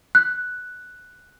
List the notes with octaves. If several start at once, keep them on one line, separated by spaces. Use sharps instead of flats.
F#6